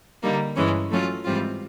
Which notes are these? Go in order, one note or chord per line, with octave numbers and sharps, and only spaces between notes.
D3 G3 A#3 D#4
G2 E3 G#3 C#4
F#3 A3 C#4 F4
G#2 E3 G3 C4 F4